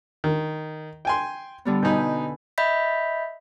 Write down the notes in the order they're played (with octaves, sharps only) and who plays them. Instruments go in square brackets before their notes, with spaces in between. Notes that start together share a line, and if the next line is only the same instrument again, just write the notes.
[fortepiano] D#3
G5 G#5 C6
[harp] D3 G3 B3
[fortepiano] B2 D#4 [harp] B4 G#5 G6
[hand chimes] D#5 E5 B5 G6 B6